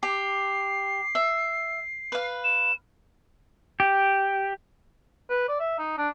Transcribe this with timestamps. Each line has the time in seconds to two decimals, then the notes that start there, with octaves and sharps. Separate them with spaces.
0.03 G4 C7
1.15 E5
2.12 B4 F5
2.44 E7
3.80 G4
5.30 B4
5.48 D5
5.60 E5
5.79 D#4
5.98 D4